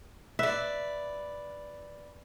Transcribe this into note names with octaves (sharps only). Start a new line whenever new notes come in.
B4 D5 E5